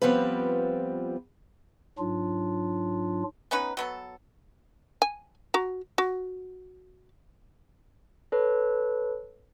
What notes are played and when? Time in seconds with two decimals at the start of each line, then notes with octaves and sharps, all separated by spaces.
0.02 F3 G3 B3 C4 F4 B4
1.99 G#2 F#3 D4 F4
3.51 B3 C#4 D#4 B4
3.77 F#3 B3 A4
5.02 G#5
5.54 F#4 A#5
5.98 F#4
8.32 A4 B4 C#5